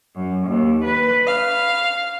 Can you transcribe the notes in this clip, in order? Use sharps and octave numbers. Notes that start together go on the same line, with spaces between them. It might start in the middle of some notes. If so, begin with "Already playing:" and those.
F#2
D#2
B4
F5